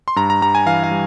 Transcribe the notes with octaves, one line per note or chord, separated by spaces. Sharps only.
C6
G2 A#5
A#5
G3 A#5
G#5
E3 F5
F5
G3